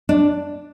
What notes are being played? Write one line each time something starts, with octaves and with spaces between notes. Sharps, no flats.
D4